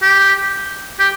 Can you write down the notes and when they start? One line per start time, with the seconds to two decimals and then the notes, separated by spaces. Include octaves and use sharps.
0.02 G4
0.99 G4